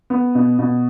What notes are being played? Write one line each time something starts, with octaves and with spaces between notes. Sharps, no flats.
B3
B2
B2